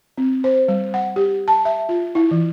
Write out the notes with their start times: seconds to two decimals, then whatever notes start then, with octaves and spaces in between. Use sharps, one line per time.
0.18 C4
0.44 C5
0.68 G3
0.94 F#5
1.16 G4
1.48 A5
1.65 E5
1.89 F4
2.15 E4
2.31 E3